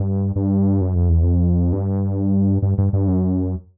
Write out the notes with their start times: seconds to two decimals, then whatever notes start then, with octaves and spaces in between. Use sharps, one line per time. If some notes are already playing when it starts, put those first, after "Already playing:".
Already playing: G2
0.36 G2
0.81 F#2
0.95 F2
1.09 E2
1.23 F2
1.73 G2
2.62 G2
2.78 G2
2.93 G2
3.08 F#2